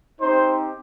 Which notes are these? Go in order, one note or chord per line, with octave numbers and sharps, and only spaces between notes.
C4 D#4 G4 C5